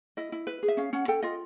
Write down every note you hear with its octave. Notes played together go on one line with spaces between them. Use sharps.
E4 D#5
E4
B4
G#4
E5
C#4 F5
C#4 F#5
A4 G5
F4 D#5